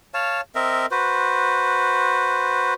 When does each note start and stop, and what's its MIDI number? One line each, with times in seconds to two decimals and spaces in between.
0.14 0.41 73
0.14 0.41 77
0.14 0.41 81
0.55 0.86 60
0.55 0.86 70
0.55 0.86 75
0.55 0.86 76
0.91 2.74 66
0.91 2.74 71
0.91 2.74 72